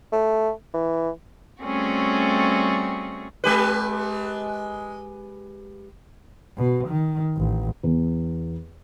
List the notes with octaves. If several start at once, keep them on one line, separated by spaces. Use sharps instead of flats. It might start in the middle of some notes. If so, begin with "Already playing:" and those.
A3
E3
G3 A3 C4 C#4 F#4 G#4
G#3 G4 B4
B2
D#3
A1
E2